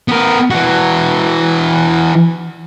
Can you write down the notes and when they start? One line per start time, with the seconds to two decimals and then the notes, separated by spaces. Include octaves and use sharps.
0.08 B3 A#4
0.51 E3 F#4